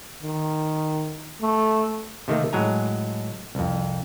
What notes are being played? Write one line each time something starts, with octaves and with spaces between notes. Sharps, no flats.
D#3
A3
C3 D#3 A3 A#3
A2 F#3 G#3 G#5 A#5
C2 F2